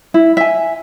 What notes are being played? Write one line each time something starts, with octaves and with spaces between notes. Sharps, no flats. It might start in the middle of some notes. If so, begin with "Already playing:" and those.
E4
E5 G#5